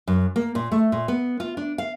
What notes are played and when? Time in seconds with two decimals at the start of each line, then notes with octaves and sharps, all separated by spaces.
0.08 F#2
0.36 A#3
0.55 A#2
0.72 A3
0.92 A#2
1.08 B3
1.40 F4
1.57 D4
1.78 F5